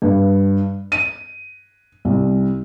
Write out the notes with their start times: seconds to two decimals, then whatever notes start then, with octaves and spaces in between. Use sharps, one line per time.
0.02 G2
0.92 D#7
2.05 C2